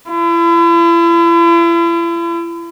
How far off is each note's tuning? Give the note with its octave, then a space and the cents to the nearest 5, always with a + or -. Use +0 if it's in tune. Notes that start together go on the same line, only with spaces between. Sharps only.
E4 +40